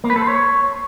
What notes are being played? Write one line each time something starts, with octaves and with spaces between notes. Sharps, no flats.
A#3
B4
A4
C5
C#5